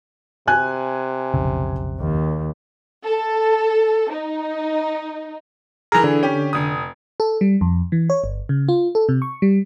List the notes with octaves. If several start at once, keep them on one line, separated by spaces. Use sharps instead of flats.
C3 G#5 F#6
F1 B1 C#3
D#2
A4
D#4
E3 G#4 A#4 A#5
D3
C#4 G4
F1 D#6
A4
G3
F2
E3
C#5
G1
C#3
F4
A4
C3
C#6
G3